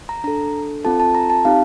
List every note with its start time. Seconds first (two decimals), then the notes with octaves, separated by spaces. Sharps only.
0.09 A#5
0.24 D4 A4 A#5
0.85 C4 F4 A4 A5
1.00 A5
1.15 A#5
1.30 A5
1.45 C4 D#4 G4 F5